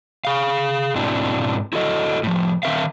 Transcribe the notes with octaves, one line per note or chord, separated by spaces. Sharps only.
G#4 F5
G#2 B2 C4 D4 E4 F#4
E4 F#4 A4 D#5
A2 F3
D#3 E3 C4 A#4 E5 F5